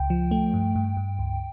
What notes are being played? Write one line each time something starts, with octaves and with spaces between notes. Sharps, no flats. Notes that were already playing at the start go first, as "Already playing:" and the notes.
Already playing: C#2 G5
F3
A3
G2
G2
G2
C#2